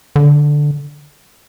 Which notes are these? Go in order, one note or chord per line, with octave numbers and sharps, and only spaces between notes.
D3